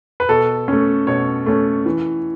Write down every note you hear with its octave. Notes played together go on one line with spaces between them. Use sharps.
B4
B2 A4
A3 C#4
B2 C#5
A3 C#4
E3